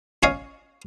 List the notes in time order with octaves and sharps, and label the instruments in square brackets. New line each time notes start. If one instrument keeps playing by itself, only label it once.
[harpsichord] C#4 C#5 D#5 F5